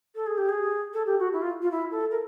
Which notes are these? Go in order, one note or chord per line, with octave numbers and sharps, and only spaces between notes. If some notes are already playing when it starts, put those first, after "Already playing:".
A4
G#4
G4
G#4
A4
G4
F#4
E4
F4
F4
E4
A4
A#4